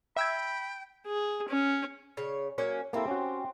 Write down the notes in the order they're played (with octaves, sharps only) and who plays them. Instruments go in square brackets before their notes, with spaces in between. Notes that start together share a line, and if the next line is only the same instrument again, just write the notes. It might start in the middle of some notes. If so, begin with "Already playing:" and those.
[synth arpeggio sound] E5 E6 G#6 [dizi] G5 [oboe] B5
[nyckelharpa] G#4
C#4
[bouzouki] C#3 C#5
F#3 A#3 C#4
[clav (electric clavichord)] A#3 E4 A4 [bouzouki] C4 G4
[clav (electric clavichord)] C#4 F#4